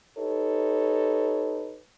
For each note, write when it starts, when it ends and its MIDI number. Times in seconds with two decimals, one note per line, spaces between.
0.17 1.79 63
0.17 1.79 67
0.17 1.79 69
0.17 1.79 71
0.17 1.79 73